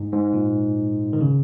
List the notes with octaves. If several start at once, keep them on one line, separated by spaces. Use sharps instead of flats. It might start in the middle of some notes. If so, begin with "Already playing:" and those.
Already playing: G#2
G#2
A#2
D#3
C#3